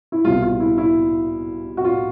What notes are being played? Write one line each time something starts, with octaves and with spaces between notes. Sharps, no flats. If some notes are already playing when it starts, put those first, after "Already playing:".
E4
C2 B2 G3 F4
F4
E4
E4
F#4
F4